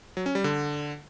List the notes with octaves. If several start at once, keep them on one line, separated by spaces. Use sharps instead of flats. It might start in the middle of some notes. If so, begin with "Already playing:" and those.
F#3
C#4
G3
D3